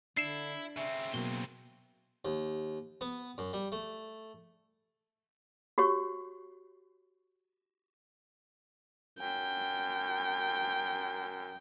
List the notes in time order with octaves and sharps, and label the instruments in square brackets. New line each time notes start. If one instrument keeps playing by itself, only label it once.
[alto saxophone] D3 [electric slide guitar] D4 [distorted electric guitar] E4 [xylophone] C7 E7
[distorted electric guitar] C#3 C4 [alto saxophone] E5
[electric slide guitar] B2 F#3 [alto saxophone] A#3 [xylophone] G7
[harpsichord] D#2
B3
F#2
G3
A3
[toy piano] F#4 G4 C#5 C#6
[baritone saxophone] F#2 [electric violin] G5